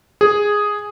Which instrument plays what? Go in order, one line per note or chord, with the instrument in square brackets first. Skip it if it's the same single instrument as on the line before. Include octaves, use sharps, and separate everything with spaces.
[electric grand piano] G#4